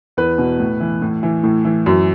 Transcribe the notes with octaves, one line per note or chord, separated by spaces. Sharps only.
E2 B4
B2
A2
E3
A2
E3
A2
E3
F#2